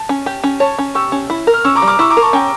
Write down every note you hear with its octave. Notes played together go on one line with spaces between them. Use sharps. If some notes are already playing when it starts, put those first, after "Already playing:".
Already playing: A5
C#4
G4
C#4
C#5 A5 C#6
C#4
G4 C#6 E6
C#4
E4
A#4
F6
C#4 C#6 E6
A#5 D6
G3
D6 F6
E4 C#6 E6
A#5 D6
A#4
A5 C#6
C#4 G5 A#5